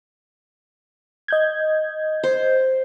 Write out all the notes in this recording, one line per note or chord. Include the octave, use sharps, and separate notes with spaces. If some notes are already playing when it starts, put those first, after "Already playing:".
D#5 G6 G#6
C5